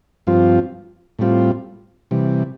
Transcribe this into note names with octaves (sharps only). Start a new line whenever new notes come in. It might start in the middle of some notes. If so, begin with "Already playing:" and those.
G2 F3 C4 F4
A2 G3 C4 F4
C3 E3 G3